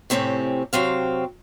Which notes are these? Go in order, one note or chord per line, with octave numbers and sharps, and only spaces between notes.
A2 C3 C4 C#4 G4
C3 F#3 C4 F5